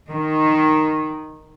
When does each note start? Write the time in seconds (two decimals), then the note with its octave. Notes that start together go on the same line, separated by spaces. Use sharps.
0.10 D#3